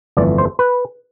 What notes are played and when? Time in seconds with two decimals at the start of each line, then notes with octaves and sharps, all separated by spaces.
0.17 G1 F2 E3 A3 D5
0.38 C5
0.59 B4